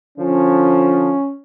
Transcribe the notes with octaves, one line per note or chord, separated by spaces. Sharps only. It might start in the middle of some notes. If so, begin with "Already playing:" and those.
D3 F3 C#4